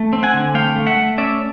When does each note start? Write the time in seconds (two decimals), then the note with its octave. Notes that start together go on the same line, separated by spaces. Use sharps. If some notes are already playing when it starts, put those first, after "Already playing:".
Already playing: A3
0.13 C4
0.23 F#5 G#5
0.34 D3
0.54 A3 F5 G5
0.76 A3
0.87 E5 F#5
0.97 A3
1.18 C#4 D5 E5